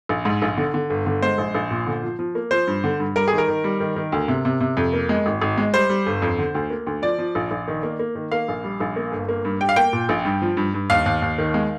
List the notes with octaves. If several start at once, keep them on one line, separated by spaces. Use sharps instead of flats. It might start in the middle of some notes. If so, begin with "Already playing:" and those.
A#1
G#2
A#1
D3
D3
G1
D3
G#3 C5
A#1
A#1
A#2
D3
F3
F3
A#3
F3 C5
G2
D3
G2
G3 A#4
D#3 G#4
A#4
D#3
G3
D#3
D#3
D2
C3
C3
C3
F2
A#3
G#3
G#1
G#1
G#3
G3 C5
G3
G1
F2
D3
D2
A#3
D2
F3 D5
F3
A#1
A#1
D#3
A#3
A#3
D#3
A#3 F5
A#1
G3
A#1
A#3
G1
A#3
G2
G3 G5
F5
A#3 G5
A#2
A#1
G2
F3
G2
G2
D#2 F5
D#2
D#2
D#3
G#3